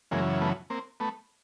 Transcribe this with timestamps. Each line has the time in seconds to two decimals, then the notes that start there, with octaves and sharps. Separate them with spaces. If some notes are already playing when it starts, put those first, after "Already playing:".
0.11 F#2 C#3 E3 G#3 A#3
0.41 A3 B3
0.70 A#3 C4
1.00 A3 B3